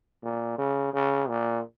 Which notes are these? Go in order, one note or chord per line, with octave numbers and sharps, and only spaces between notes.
A#2
C#3
C#3
A#2